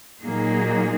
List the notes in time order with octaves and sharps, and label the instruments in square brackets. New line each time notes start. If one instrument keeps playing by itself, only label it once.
[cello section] A#2 F#3 A#3 D#4 G#4